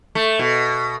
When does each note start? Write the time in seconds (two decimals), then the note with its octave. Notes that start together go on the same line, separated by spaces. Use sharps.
0.15 A3
0.39 B2